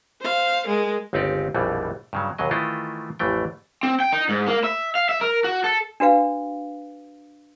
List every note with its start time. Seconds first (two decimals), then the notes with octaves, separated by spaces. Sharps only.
0.21 C5 F5
0.66 G#3 A#4
1.13 G1 C#2 C4 D#4 G4 D5
1.54 A#1 F2 B2 E3 G3
2.13 G2 C#3 F#3
2.38 D#2 B2 F#3 D#5
2.51 D#3 E3 A3 E4 F4 D#5
3.19 A1 F2 E3 A3 G5
3.83 C4
4.00 G5
4.13 D#4
4.29 G#2
4.48 A#3
4.64 E5
4.95 F5
5.09 E5
5.21 A#4
5.44 F#4
5.64 A4
6.00 D4 F#4 B4 F5